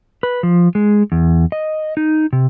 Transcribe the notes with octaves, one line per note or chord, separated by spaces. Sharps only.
B4
F3
G#3
E2
D#5
D#4
C3